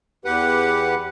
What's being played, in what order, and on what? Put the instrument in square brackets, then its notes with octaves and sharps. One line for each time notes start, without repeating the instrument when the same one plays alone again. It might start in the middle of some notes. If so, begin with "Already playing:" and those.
[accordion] E2 G4 B4 F#5